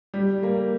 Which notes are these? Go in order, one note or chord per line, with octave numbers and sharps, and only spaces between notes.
G3
A#3